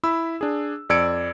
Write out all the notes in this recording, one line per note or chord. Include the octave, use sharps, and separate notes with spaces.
E4 B5 E6
D4 G#4
F2 D5 E6 G#6 C#7 D7